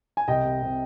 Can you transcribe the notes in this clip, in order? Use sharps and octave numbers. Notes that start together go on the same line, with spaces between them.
G#5
C2 D#5 G5
C3
C3